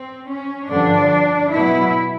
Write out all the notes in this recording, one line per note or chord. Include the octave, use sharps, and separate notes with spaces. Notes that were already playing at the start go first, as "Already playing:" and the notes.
Already playing: C4
C#4
G2 D3 F3 D4
B2 F#3 B3 E4